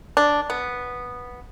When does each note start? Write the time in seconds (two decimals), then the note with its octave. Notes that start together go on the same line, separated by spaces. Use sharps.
0.17 D4
0.50 B3